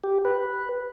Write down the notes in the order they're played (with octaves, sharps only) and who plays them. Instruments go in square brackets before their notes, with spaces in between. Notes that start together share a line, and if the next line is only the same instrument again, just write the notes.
[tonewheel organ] G4
B4